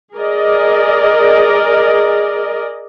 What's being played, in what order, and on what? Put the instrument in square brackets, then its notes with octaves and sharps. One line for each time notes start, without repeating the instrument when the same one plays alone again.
[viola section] G#4 A#4 D5 D#5